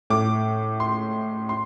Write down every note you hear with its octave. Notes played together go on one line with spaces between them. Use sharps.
A2 D6
C6
C6